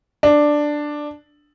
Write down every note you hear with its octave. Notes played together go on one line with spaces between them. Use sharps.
D4